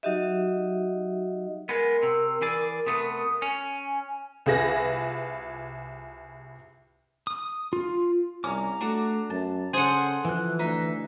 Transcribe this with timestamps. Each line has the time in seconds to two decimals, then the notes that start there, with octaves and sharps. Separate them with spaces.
0.03 F#3 D#4 F#4 G4 D#5 E5
1.69 G#3 B3 A#4
2.03 C3 E6
2.42 E3 G#4 D5
2.87 C3 A3 B3 D#6
3.42 C#4 G#5
4.46 C2 F4 G#4 B4 A#6
7.27 D#6
7.73 F4
8.44 C2 C#4 A#5 D6
8.81 A3 D4 F#4
9.30 F#2 A5
9.73 C#3 G#4 A4 C5 F#5
10.25 E3 F3 F#6
10.59 D2 D#4 E5